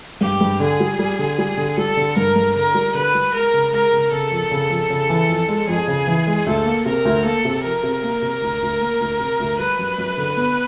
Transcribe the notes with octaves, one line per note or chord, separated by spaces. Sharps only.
G2 G4
G2
D3 G#4
G3
G3
D3
G3
D3
G3 A4
D3
G2 A#4
G2
D3 A#4
G3
D3 B4
G3
G#3 A#4
C#3
G#3 A#4
C#3
C#3 A4
F2
C#3
F2
C#3
E3
F2
G#3
F2 G#4
C#3
E3
G#3
D2 A4
A#3
C3 A#4
D2
A#3 A4
C3
F3 A#4
C3
A#3
C3
D2
D2
A#3
D2
C3
D2
G3 B4
F#2
F#2
D3
B3